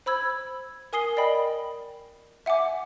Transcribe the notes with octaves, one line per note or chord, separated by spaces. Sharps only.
C5 B5 E6 G#6
A#4 G#5 D#6 C7 G7
A#4 D5 D#5 G5 B5
E5 F#5 G#5 D6